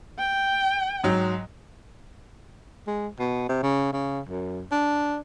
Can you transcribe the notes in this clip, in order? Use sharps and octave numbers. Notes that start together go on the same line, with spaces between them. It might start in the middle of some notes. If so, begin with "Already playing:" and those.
G5
G#2 F#3
G#3
B2
C3
C#3
C#3
F#2
D4